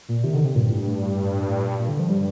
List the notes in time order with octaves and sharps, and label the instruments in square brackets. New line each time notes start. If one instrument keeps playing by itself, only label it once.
[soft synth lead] A#2
[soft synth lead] C3 [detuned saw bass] D#3
[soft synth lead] D3
C3
[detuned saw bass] G2 [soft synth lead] A#2
[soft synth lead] A2
A2
A2
A#2
[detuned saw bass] G2 [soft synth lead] A#2
[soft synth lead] D3
[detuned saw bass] G2 [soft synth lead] F3
[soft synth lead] G3